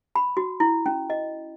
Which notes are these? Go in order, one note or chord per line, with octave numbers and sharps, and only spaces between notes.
B5
F#4
E4
C#4
D#5